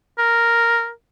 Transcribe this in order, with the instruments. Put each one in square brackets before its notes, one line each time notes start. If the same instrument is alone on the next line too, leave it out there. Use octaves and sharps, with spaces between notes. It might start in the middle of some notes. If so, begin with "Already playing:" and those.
[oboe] A#4